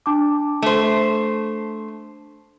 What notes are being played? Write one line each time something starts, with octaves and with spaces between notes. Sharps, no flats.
D4 A5 D6
A3 C5